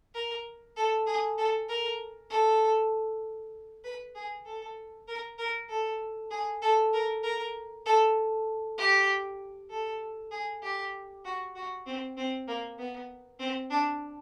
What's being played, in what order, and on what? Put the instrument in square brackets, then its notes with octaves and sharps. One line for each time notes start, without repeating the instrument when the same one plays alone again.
[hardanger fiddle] A#4
A4
G#4
A4
A#4
A4
B4
G#4
A4
A#4
A#4
A4
G#4
A4
A#4
A#4
A4
G4
A4
G#4
G4
F#4
F#4
C4
C4
A#3
B3
C4
D4